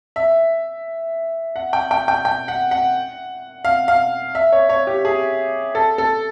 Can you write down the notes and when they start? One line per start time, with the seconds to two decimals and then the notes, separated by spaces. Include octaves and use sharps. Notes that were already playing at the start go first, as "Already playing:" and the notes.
0.16 E5
1.56 F#5
1.73 G5
1.91 G5
2.08 G5
2.25 G5
2.48 F#5
2.71 F#5
3.65 F5
3.88 F5
4.35 E5
4.52 C#5
4.69 C#5
4.87 G4
5.05 G#4
5.75 A4
5.98 A4